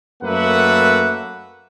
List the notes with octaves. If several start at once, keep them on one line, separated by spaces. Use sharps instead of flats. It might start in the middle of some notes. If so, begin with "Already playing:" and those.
F#2 A3 A#3 B4 E5 F#5